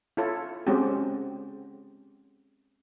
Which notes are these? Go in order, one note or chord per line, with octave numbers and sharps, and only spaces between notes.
E4 F4 A4 C#5
G#3 C4 C#4 F#4 G4